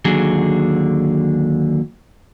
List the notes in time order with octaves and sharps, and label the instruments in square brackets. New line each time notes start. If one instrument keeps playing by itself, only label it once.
[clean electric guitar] D#2 D3 F#3 G#4